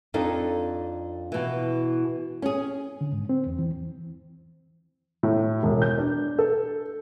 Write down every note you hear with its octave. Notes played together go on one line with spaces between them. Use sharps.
F2 D4 D#4 A4
B2 E3
C#4 G#4
D3
G#2
C4
E2
E3
A2
E1
G6
D4
A4